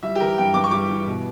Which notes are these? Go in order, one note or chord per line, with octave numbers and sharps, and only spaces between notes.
G3 E5
G4
E3 A#4
G2 G5
G2 D6
C#6
G3 D6
E3
B2